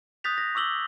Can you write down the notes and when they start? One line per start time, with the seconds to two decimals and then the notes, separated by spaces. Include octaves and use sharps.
0.24 D#6 F#6 G6 A6 B6 F7
0.38 A#6
0.55 C#6 D6 E6 F#7 G7